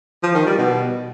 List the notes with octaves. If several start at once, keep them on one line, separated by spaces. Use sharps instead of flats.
F3
D#3
G3
B2